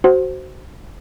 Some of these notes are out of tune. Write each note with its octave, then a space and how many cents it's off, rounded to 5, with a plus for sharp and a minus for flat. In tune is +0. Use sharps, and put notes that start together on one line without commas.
F#4 +15 C5 +0